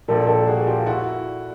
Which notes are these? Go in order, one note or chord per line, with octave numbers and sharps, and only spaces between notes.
A#1 A#2 G4 A4
G4 A4
F#4 G#4
F4 G4
E4 F#4